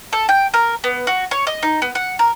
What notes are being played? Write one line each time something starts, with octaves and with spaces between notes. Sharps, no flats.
A4
G5
A#4
B3
F#4
C#5
D#5
D#4
B3
F#5
A#4